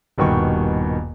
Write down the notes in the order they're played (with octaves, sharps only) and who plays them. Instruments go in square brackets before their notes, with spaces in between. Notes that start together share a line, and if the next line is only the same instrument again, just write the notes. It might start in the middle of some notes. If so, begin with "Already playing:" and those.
[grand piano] D#1 G2 B2 D#3 G5 C#6